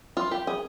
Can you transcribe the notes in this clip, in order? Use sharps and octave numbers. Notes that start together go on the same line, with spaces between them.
F4
G4
G#4